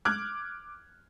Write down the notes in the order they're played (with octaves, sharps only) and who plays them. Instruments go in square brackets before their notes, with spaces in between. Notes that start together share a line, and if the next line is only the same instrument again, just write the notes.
[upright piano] D6 F6 F#6 G#6